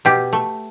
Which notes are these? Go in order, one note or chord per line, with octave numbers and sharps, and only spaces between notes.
B2 G4
A3